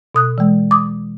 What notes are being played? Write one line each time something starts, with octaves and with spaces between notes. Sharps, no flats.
B2 D#6 F#6
E3 G#3
D6 D#6